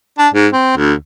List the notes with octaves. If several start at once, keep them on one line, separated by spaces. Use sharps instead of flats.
D4
G#2
C4
D2